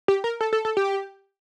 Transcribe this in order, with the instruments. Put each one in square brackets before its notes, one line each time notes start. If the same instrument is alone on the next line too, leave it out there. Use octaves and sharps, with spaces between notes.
[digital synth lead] G4
A#4
A4
A4
A4
G4